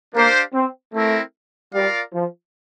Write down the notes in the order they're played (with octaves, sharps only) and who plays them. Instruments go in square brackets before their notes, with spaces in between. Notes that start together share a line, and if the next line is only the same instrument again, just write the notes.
[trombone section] A#3 [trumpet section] D4 G4 C5 F5
[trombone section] C4
[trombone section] A3 [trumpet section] C4 E4 A#4
[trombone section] G3 [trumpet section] F4 A#4 D5 F5
[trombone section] F3